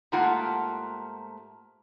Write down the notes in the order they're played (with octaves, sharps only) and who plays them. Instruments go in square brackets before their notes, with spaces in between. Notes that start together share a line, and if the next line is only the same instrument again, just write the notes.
[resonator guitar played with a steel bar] G#2 A3 A#3 F4 G4 F#5